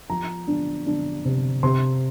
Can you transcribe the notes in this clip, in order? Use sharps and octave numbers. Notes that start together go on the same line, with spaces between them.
F3 A#5
D4
D4
C3
C3 C6